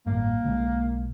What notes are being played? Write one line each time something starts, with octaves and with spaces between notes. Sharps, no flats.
A1 G2 A#3
B1 C#3 G#3